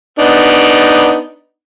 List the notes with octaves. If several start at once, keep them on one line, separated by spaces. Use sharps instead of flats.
B3 D4 D#4